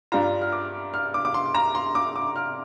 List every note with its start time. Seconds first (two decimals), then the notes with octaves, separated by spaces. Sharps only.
0.12 G2 G3 D4 F4 A#5
0.41 F6
0.53 D6
0.94 F6
1.14 D6
1.25 D6
1.34 C6
1.54 A#5
1.75 C6
1.95 D6
2.16 D6
2.36 F6